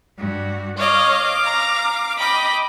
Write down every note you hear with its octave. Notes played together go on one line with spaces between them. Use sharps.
G2 F#4
C#5 D#5 F5 D6
A#5
D#5 G5 B5 D6